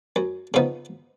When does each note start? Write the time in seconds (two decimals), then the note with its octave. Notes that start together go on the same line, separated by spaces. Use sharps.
0.16 F#2
0.54 C#3 F3 B3 D#4